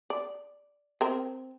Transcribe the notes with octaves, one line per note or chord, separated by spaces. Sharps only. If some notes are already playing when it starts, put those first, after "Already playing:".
D5
C4 A#4